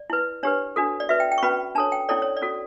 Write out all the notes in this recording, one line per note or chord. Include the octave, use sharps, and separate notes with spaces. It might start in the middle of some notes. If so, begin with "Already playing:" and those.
Already playing: D5
E4 B4
D4 G4 B4 C#5
D4 F#4 A4
D5
F#4 B4 E5
G5
G5
C#6
C#4 F#4 B4 B5
D4 A4 C#5 A5
G5
C#4 E4 A4 C#5 D5
C#5
D5
C#4 F#4 A4